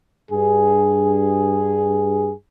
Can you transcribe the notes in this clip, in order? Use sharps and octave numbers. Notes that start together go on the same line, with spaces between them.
G2 G#4